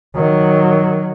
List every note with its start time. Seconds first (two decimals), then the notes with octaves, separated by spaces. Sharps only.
0.15 D#3 F#3